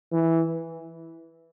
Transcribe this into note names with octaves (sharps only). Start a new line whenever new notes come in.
E3